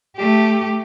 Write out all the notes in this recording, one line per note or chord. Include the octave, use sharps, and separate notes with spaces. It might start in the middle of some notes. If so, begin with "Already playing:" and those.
A3 G4